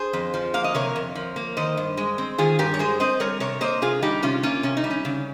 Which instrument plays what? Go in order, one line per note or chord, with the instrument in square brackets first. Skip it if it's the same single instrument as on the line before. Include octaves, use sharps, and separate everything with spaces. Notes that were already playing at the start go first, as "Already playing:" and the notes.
Already playing: [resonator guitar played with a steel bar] G#4 C5
F2
F3
A#3 F5
D#5
C3 A#4 C#5
F2
F3
A#3
D#3 C5 D#5
G2
G#3
C4
D#3 F4 G#4
G2 G4 A#4
C#5
G#3 G#4 C5
C4 C5 D#5
G3 A#4 C#5
C3 A#4 C#5
A#3 C5 D#5
C3 F4 G#4
G3 D#4 G4
C3 C#4 F4
A#3 C#4 F4
C3 C#4
D#4
G3
C#4
C#3